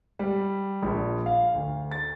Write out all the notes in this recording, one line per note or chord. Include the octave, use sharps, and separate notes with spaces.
G3
A#1
F5
D2
A6